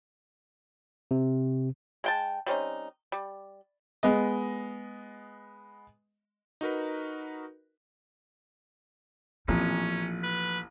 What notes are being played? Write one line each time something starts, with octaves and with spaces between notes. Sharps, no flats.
C3
G#3 G5 A5
G3 C4 C#4 D#4
G3
G#3 B3 D#5
D#4 F#4 A#4 B4
A1 A#2 F3 C4 C#4
B4